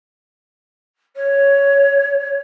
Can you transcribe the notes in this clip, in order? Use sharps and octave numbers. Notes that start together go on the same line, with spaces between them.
C#5